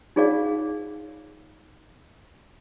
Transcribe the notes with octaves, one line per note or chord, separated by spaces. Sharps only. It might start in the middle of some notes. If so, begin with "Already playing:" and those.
D#4 F4 G#4 C#5 D5 F5